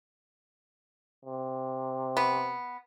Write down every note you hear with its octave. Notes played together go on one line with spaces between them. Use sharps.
C3
B3